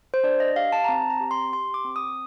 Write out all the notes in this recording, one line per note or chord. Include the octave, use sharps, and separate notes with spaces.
C5
D4 D5
D#5
G4 F5
A5
A#5
C4 A5
A#5
G4
C6
G4 C6
D6
C4
D#6